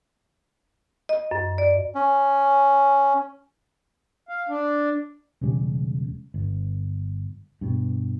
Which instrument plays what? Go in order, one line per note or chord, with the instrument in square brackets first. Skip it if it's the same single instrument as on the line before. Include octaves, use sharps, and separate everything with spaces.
[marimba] D#5
F#2
D5
[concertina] C#4
[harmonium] F5
D4
[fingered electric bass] E1 C#3 G3
G1
G2 B2